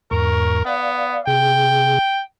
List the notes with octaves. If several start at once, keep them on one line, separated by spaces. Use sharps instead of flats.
E2 G#2 A#4 C#6
B3 D5 F5
C3 G#4 G5